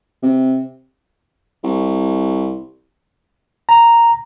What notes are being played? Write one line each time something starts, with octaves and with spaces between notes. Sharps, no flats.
C3
C2
A#5